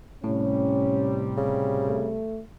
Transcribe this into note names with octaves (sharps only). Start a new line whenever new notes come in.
A2 C3 G3 C#4
C#3
A3